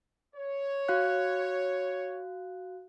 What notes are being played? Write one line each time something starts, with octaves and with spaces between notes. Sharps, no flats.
C#5
F#4 F5 F#6